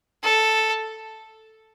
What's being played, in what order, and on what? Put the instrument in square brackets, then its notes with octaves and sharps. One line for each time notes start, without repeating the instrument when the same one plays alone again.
[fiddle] A4